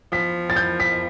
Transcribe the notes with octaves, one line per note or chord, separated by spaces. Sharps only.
F3 B6
A6
G6
B6